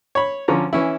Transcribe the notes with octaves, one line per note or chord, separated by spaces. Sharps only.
C#5 B5
D3 F3 C#4 A#5
E3 C#4 E4